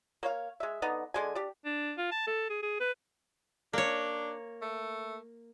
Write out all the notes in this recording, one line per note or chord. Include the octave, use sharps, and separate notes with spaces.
A#3 C#5 F5
G#3 E5
D3 B3 D#4
D3 G#3 G#5
D4 G4
D4
F4
A5
A4
G#4
G#4
B4
A#3 D4 C#5
A3